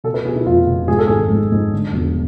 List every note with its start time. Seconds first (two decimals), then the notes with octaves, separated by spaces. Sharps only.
0.04 B2 A4
0.14 B4
0.25 B2 G#4
0.35 E4
0.46 F1 F4
0.67 B2
0.88 G#2 G#4
0.99 A4
1.07 G#1 G#4
1.30 G#2
1.52 G#2
1.73 D3
1.93 E1